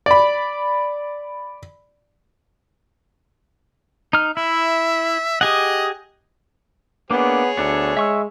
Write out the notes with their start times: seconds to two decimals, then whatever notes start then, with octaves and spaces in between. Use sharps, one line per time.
0.06 D5 B5
4.13 D#4 F6
4.37 E4 E5
5.41 G4 G#4 D#5 F#5
7.11 A#3 B3 D4 G#4 C#5
7.57 D2 B3 D4 A4
7.97 G#3 E5 C#6 E6